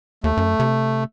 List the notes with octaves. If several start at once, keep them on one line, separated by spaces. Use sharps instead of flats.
D#2 A3
F#2
C3